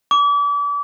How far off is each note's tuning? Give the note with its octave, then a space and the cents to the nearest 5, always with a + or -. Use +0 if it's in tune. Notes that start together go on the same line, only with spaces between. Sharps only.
D6 -35